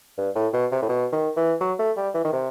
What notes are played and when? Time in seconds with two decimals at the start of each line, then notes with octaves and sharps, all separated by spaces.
0.17 G2
0.35 A2
0.53 B2
0.72 C3
0.82 A2
0.89 B2
1.12 D#3
1.37 E3
1.60 F#3
1.79 A3
1.97 G3
2.14 E3
2.24 D#3
2.32 C3